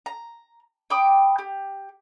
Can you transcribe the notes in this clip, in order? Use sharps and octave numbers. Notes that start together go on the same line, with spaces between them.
A#5
G5 B5 D6 D#6
G4